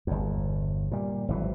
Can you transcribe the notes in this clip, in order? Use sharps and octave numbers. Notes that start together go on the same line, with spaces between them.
G1 E2
A#2 G3
G#1 E3 F#3